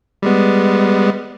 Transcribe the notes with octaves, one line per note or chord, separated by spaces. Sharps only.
G3 G#3 B3